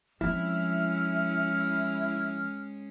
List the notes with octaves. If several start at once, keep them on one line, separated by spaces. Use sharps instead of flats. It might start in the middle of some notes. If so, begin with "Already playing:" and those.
F3 G#3 C4 C#4 E4 F6